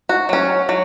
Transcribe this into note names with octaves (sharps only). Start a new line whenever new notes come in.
F#4
F#3 C#4
F#3